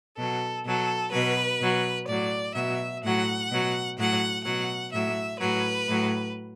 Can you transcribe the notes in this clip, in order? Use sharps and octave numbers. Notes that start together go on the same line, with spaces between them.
B2 F#3 A4
B2 F#3 A4
B2 F#3 B4
B2 F#3
A2 F#3 D5
B2 F#3 E5
A2 F#3 F#5
B2 F#3
A2 F#3 F#5
B2 F#3 F#5
A2 F#3 E5
A2 F#3 B4
A2 F#3